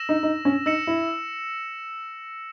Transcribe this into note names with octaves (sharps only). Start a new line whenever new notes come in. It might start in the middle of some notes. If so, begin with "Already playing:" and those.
Already playing: E6 A#6 E7
D#4
D#4
C#4
D#4 E6 A#6 C#7 E7
E4